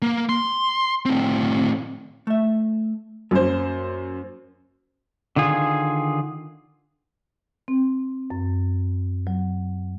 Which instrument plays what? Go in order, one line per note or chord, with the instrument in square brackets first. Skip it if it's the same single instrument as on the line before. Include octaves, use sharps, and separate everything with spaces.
[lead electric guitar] A#3
C6
A2 C4
[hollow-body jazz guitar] A3 E5
[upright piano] F#2 C5 [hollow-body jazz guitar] A#3
[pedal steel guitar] D3 D#3 F4 G#4
[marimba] C4
F#2
F#3